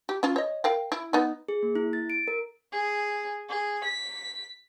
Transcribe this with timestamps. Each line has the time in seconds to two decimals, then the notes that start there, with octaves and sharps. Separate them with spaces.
0.09 G4
0.23 C#4 F4
0.36 C#5 D#5
0.64 A#4 F5 G5
0.92 E4
1.13 B3 D#4
1.48 G#4
1.63 A#3
1.75 E4
1.93 A6
2.10 D7
2.28 A#4
2.72 G#4
3.50 G#4
3.84 B6